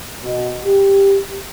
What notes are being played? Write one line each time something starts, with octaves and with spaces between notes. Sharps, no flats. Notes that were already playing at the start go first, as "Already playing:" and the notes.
B2
G4